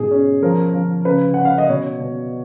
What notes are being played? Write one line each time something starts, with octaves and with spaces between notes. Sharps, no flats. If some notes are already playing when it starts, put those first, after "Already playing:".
Already playing: G#2 B2 G#4
C#4
F3 A#4
F3
C#3 B4
C#4 F#5
F5
D#5
B2 C#5
B2